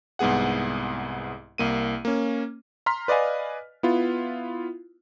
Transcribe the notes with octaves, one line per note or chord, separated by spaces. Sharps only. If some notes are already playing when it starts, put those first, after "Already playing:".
C2 G#2 B3 G#4 F#5
C2 A#3 D#7
A#3 C#4
A#5 C6 F6 B6
B4 D5 D#5 F5 G#5
B3 E4 F4